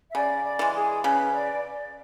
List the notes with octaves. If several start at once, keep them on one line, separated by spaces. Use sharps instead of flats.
E5
C#3 D5
D5
E3 G#3
G#4
C#3 B4
D5